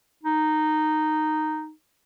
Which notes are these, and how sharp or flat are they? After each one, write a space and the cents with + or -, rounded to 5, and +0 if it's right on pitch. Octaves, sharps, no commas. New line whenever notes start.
D#4 -10